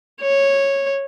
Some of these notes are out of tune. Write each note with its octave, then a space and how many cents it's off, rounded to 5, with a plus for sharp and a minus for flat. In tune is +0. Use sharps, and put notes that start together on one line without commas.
C#5 -10